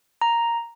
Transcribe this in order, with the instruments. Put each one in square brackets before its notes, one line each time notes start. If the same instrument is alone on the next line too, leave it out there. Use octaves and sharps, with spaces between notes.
[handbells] A#5